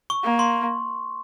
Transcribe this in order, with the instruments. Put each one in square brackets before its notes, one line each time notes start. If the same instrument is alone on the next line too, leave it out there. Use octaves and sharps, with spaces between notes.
[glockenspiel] C#6
[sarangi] A#3
[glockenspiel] C6